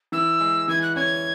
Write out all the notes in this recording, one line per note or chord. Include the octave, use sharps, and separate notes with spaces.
E3 E6
G#3
E3 G#6
F#6
C#4 G#6